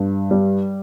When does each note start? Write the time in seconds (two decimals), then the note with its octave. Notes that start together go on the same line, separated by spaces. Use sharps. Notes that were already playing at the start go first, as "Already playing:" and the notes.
Already playing: G2
0.31 G3